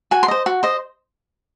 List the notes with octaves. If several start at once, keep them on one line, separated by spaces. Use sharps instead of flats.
F#4 G#5
C6
C5 D#5
F#4
C5 D#5